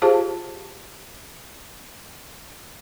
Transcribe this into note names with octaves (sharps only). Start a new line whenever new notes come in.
F4 G4 G#4 C5 F5 A5